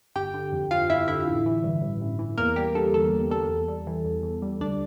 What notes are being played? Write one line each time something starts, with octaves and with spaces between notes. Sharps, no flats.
G1 G4 G5
D3
F2
F3 F4 F5
G1 E4 E5
D3 E4 E5
A1
E3
G2
A1
A1
E3
E2 A#3 A#4
G3 G4
D3 A4
E2 A4
E2
G3 A4
E2
G3
E3
E2
E2
G3
D2 D4 D5